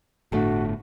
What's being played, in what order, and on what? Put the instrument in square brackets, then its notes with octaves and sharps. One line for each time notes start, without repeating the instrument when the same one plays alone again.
[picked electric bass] G1 A3 D4 [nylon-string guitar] A2 A4 [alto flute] F#4